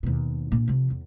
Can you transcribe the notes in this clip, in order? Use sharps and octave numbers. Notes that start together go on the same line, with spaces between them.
D#2 B2
A#2 D4
C3 F3
E2